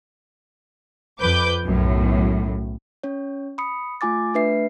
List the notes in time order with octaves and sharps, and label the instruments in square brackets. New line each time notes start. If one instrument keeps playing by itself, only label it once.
[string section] F2 B4 D6 G6
B1 F#2 A2
[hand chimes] C#4 C#5
B5 D#6 C#7
A3 F4 G#5 D6 A6
A3 D4 B4 E5 C7